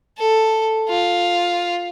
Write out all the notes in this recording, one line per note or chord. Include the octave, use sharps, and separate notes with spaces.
A4
F4